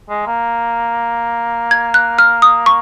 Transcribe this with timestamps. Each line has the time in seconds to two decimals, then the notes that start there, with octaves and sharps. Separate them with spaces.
0.10 G#3
0.27 A#3
1.71 G#6
1.94 F#6
2.19 F6
2.42 D#6
2.66 C#6